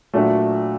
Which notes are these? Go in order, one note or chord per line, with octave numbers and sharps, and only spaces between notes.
A#2 F#3 A3 D4 F#4